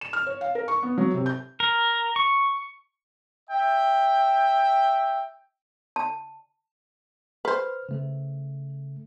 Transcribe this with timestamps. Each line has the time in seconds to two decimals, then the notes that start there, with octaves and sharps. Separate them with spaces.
0.01 E7
0.13 F6
0.27 C#5
0.41 F5
0.55 A#4
0.68 C#6
0.83 B3
0.98 F#3
1.14 C3
1.26 G6
1.60 A#4
2.16 C#6
3.50 E5 G5
5.96 A5
7.45 B4 C5 F6
7.89 C#3 A3 A4